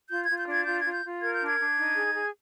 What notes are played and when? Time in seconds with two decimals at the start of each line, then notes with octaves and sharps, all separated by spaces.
0.10 F4 G6
0.24 F4 G#6
0.37 G6
0.47 D4 G#6
0.65 F4 G6
0.79 F4 G#6
0.93 G6
1.03 F4
1.21 A#4 G#6
1.33 G6
1.39 D4
1.47 G#6
1.58 D4
1.76 D#4
1.95 G#4
2.13 G#4